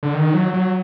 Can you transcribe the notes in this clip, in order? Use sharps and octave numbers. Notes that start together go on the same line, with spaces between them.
D3
D#3
F#3
F#3